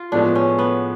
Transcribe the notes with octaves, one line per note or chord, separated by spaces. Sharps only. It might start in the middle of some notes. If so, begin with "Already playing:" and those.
Already playing: F4
A2 F3 G#3 B3 D4
C#4
B3